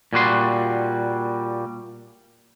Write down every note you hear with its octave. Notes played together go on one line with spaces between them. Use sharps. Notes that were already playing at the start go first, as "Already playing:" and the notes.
A#2 G3 F#4 C6